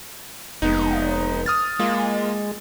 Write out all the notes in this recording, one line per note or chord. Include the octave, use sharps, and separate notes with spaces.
F1 G#3 B3 D#4
D#6 F6 A6
G#3 A#3 F4